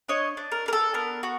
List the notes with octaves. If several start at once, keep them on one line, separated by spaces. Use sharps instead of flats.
D4 C#5 D#5
D4
A#4
D4 A#4
A4
B3 A#4
F#4